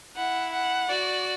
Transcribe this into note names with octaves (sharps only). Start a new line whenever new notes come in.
E4 F#5
F#5
F#4 D5